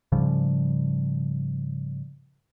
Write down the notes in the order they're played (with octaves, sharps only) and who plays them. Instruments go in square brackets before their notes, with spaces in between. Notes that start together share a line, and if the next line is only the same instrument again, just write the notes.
[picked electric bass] G#2 C#3 F3 G3